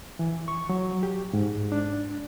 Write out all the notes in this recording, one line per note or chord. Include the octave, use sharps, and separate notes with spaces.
E3
C#6
F#3
G4
G#2
D4